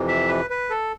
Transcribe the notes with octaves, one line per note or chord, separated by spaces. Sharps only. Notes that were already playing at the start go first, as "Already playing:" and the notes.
Already playing: F2 C3 E3
E5
B4
B4
A4